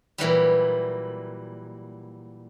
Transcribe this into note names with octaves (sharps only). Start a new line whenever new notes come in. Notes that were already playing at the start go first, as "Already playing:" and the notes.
A#2 E3 F#3 G3